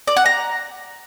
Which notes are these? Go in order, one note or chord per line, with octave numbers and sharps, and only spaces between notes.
D5
F#5
A#5